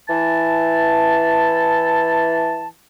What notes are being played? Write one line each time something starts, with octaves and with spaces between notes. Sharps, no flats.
E3 A5